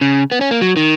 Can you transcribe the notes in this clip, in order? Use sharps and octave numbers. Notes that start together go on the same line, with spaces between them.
C#3
B3
C#4
A#3
F#3
D#3